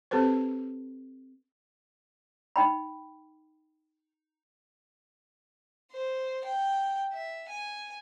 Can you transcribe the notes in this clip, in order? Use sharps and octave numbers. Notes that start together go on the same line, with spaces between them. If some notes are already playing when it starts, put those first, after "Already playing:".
C4 G4 A4 B4 C5
D#4 G5 B5
C5
G5
E5
G#5